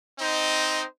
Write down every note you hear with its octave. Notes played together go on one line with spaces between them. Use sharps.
C4 D#4 C5 D#5